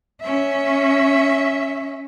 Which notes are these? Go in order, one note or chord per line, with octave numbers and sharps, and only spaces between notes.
C#4 E5